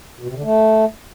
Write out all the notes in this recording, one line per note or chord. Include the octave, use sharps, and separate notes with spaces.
B2
C3
D3
A3